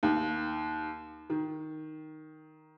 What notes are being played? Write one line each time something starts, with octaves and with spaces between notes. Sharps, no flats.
D#2
D#3